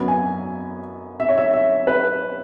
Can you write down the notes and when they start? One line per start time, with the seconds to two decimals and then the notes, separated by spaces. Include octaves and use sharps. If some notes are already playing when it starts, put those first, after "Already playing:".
Already playing: F#2 F#3 B3 B5
0.08 G#5
1.20 E5
1.29 C#5
1.38 E5
1.53 E5
1.87 B4